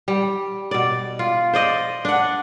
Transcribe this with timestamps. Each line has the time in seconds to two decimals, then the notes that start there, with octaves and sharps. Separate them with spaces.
0.08 G3
0.71 B2 D5
1.19 F4
1.53 C5 D5 D#5
2.05 D4 F#5